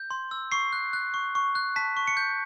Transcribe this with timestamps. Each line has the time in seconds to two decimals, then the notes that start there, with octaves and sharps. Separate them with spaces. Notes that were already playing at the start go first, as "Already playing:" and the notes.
Already playing: G6
0.11 C6
0.31 E6
0.52 C#6 C7
0.73 F#6
0.93 F#6
1.14 C#6
1.35 C#6
1.55 F#6
1.76 A5 B6
1.97 C#6
2.07 C#7
2.17 G6